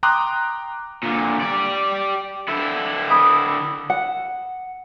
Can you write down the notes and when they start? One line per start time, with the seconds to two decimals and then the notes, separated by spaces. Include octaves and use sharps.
0.03 G5 A#5 C6 D6 D#6 F#6
1.03 A#2 D3
1.41 G4 D5
2.48 D3 E4
3.10 B5 D#6 D7
3.90 F#5